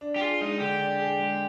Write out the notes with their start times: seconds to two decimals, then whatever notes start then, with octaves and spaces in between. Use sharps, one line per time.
0.01 D4
0.16 G4
0.21 F4 G#4
0.41 G#3 D#4
0.60 D3 G4
0.80 D4
1.00 G#4
1.19 G#3